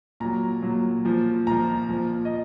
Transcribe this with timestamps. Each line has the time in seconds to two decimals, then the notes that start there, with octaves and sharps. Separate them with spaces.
0.20 A#2 F#3 A#5
0.62 A#2 F#3
1.05 A#2 F3
1.47 A#2 F3 A#5
1.89 A#2 F3
2.25 D#5